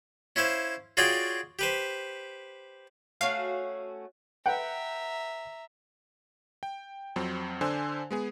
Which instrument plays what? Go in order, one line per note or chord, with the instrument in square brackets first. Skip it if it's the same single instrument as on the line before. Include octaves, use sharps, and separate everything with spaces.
[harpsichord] C#4 E4 C5 F5
F4 F#4 G#4 C#5 D5 G5
G4 B4 C5
[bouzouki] A3 C#4 F#4 [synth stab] F5
[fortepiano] B4 F#5 G5 [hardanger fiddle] E5 A#5
[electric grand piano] G5
F2 F#3 C4
D3 D4 C5 G#5 E6
G#3 B3 G#4